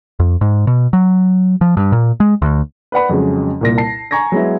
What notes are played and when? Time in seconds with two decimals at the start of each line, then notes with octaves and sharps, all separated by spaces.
0.20 F2
0.41 G#2
0.67 B2
0.93 F#3
1.61 F3
1.77 G2
1.92 A#2
2.20 G#3
2.42 D2
2.92 B4 D5 F#5 B5
3.09 F2 C#3 F#3 G#3
3.61 C2 A#2 A#6
3.78 A5 C7
4.11 G#5 A#5 C#6 G#6 A#6
4.32 F#3 G#3 B3 E4